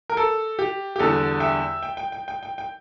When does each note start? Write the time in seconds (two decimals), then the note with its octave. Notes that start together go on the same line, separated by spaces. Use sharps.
0.10 A#4
0.17 A4
0.59 G4
0.96 G4
0.99 E2 D3 G3 A4
1.40 E5 G5
1.82 G5
1.97 G5
2.12 G5
2.28 G5
2.43 G5
2.58 G5